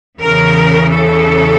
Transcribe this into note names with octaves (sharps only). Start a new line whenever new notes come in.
E2 C#3 E3 A#4
A4